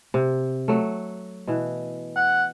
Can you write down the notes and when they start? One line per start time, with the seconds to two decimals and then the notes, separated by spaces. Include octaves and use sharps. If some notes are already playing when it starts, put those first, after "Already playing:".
0.14 C3
0.68 F#3 A3
1.48 B2 E3
2.16 F#5